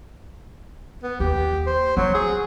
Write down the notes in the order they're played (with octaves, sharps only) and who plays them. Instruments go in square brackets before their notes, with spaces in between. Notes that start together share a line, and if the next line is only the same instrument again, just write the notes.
[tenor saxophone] B3
[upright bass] D#2 [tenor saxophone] G4
[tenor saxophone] C5
[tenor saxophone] F#3 [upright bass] C#4
[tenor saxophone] G#4